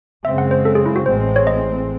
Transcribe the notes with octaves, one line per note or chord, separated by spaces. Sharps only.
F#2 C#3 G#3 C4 E5
F#5
C5
A4
G#4
E4
F#4
A1 A2 G#3 C4 C5
C#5
D#5